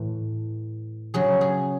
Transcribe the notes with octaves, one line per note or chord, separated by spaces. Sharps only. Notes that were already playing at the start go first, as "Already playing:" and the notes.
Already playing: A2 E3
C#3 F#3 G#4
G#4